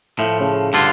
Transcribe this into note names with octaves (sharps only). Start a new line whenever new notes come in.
A2 F3 A3
C#3
G2 D3 F4